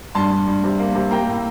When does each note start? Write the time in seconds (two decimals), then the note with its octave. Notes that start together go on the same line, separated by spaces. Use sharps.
0.15 G2 A5 C6
0.31 G2
0.47 G2
0.63 C3
0.80 A#3
0.95 C3
1.11 A#3 G5 A#5
1.27 A2